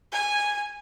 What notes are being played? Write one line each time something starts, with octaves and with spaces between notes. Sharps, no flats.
G#5